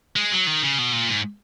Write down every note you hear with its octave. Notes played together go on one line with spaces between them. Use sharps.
G#3
F#3
D#3
C#3
B2
A#2
G#2